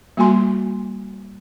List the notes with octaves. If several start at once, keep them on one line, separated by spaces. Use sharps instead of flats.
G3 A#3 F#4 G#5 C6